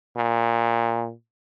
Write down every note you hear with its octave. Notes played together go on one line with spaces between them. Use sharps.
A#2